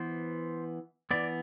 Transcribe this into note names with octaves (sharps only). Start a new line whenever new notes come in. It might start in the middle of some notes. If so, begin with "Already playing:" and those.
Already playing: E3 B3 C5
E3 B3 D5